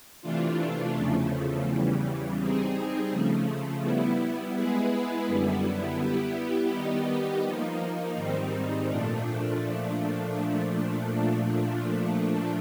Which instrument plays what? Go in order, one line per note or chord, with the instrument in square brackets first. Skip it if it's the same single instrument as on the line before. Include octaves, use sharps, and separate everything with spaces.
[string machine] C3 E3 A3 D4 F4
E2 C#3 F3 A3
E2 C#3 E3 G3
G3 C4 D#4 G#4
C#3 F3 A3
G3 B3 E4
G#3 B3 E4 G#4 B4
F#2 D3 G3 B3 E4
G3 B3 E4 G4
D#3 G3 B3 D#4 G4
F3 A#3 D#4
G#2 D#3 G3 C4 D#4
A#2 F3 A3 D4